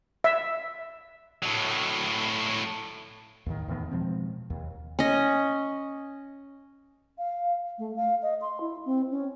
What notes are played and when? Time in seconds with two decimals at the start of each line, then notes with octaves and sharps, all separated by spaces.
0.24 E5
1.43 A2 F#3
3.46 D#2 A2 D#3
3.68 E2 A2 D#3 B3
3.91 B2 F3 G#3 C4
4.50 D#2
4.99 C#4 D#5
7.18 F5
7.79 A3
7.96 F5
8.22 D#5
8.42 C6
8.60 E4
8.85 C4
9.11 C#4